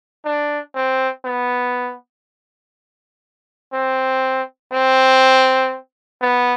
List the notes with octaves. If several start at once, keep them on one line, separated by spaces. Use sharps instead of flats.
D4
C4
B3
C4
C4
B3